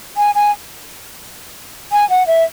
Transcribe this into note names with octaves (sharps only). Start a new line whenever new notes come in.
G#5
G#5
G#5
F#5
E5